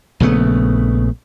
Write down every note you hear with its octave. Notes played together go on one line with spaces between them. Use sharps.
A#1 C#3 A3 B3